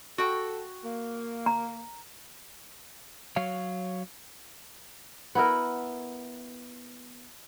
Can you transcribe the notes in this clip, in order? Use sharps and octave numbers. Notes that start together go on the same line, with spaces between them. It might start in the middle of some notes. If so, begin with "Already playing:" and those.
F#4 A4 G5
A#3
A#5
F#3 C#5 F5
B3 E4 A#4